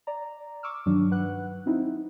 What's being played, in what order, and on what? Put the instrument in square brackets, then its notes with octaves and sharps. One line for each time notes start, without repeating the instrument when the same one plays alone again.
[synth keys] D5 A#5
C#6 D6 E6 F6
G2 D#3 F#3 D4
B4 F#5 F#6
C4 D#4 E4